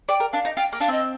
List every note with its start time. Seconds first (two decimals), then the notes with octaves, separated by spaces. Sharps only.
0.09 D5 G5
0.20 A#4
0.32 D4 F5
0.45 D#4
0.57 F4 G5
0.72 A#3
0.80 D4 F5
0.88 C4 D#5